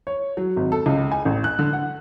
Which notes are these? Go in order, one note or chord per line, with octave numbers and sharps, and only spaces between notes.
C#5
F#3
G#1
A4
C#2
G#5
A1
F#6
D3
F#5